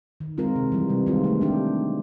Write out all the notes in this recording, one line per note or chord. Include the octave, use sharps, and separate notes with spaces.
D#3
G#3 C4 F4 A#4
C3
E3 G3
C3
D#3 G#3 C4 F4
A3
D4 G4